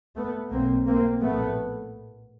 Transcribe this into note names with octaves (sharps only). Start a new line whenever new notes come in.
A3 B3
B1 B2 A#3 C4
A#3 C4
A#1 A2 A3 B3